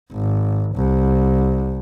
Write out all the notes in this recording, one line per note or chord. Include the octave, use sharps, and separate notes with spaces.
G#1
C2